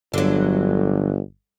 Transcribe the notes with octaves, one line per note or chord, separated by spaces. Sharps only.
G1 D3 F#3